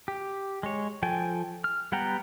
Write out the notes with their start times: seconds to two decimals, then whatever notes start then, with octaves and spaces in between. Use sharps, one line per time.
0.08 G4
0.63 G#3 C#5
1.03 F3 A4 G5 G#5
1.64 F6
1.92 G3 B3 F#5 G5 A#5